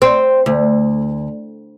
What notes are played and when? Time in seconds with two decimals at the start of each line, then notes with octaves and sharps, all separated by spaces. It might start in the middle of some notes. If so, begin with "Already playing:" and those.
0.02 C4
0.46 D2